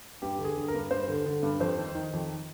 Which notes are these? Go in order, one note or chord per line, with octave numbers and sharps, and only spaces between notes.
G2 G4
D3
G#4
D3
A#4
G2
G2 C5
D3
D3
G2
F2 C5
D#3
D#3
F2